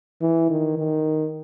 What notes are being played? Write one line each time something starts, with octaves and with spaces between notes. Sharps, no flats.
E3
D#3
D#3